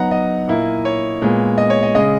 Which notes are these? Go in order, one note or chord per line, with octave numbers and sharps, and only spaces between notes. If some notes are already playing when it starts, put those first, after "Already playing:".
Already playing: F#3 B3 D#4 F#5 A#5
D#5
A#2 A#3 E4
C#5
A#2 G#3 B3
D#5
C#5
D#5
C#3 G#3 C#4 D#5